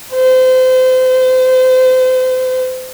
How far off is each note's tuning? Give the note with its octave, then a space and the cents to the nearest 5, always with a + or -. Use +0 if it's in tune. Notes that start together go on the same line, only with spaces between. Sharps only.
C5 -30